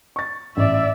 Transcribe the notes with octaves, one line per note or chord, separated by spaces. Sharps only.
C#6 A6
A1 D5 E5